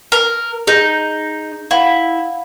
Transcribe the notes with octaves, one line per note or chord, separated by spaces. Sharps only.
A#4
D#4 G#4 G6
E4 F5 F#5 B5